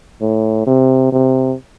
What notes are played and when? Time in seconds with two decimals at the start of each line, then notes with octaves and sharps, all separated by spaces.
0.21 A2
0.67 C3
1.12 C3